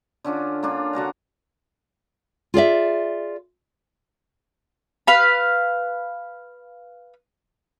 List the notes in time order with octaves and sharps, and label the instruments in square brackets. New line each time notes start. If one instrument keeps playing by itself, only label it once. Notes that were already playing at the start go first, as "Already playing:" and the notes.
[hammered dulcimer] D3 C#4 D4 F4
A#3 C#4 D4 F4
D3 F#4 A5 A#5
[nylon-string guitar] F4 G#4 D5 E5
[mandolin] B4 F5 B5